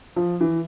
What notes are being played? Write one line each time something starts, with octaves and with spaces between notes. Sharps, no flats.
F3
E3